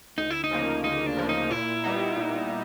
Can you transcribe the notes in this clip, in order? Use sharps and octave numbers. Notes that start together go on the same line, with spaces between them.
D2 D#4
E4
D#4
C#3 F3 A#3
D2 D#4
D4
C#3 F3 A#3
D#4
A#2 E4
G3 B3 D#4
A#2